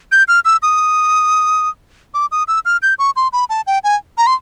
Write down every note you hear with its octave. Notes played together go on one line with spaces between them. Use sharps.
G6
F6
E6
D#6
D6
D#6
E6
F6
G6
C#6
C6
B5
A5
G5
G#5
A#5
C6